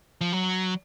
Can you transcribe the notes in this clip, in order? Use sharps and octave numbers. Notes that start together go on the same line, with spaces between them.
F3
F#3